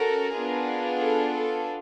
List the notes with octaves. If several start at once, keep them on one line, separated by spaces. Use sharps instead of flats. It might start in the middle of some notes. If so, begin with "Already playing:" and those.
Already playing: C#4 F#4 A4 A#4
B3 D4 F4 G#4
A4
A4